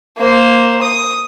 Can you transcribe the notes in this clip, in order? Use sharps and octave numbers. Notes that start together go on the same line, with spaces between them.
A#3 C5
D#6